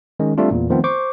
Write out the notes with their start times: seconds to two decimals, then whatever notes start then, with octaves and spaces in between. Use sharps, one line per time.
0.20 D#3 G#3 C#4
0.38 G3 A3 C4 D4 F4
0.51 E2 A#2
0.70 D#3 F3 A3 B3 C4
0.84 C5 C#6 D6